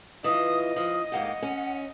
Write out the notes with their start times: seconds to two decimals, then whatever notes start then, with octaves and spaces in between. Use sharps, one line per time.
0.24 E3 F4 D#5 D#6
0.76 F3 D#6
1.12 G#2 A#3 G4 F#5
1.42 C#4